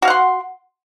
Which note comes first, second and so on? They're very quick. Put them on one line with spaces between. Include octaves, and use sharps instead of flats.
F#4 F5 F#5 C6